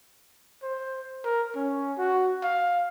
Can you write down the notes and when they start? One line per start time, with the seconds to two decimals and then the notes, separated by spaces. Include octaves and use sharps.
0.63 C5
1.24 A#4
1.55 C#4
1.98 F#4
2.43 F5